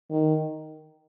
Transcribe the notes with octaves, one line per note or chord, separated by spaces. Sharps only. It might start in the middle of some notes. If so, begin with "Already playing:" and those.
D#3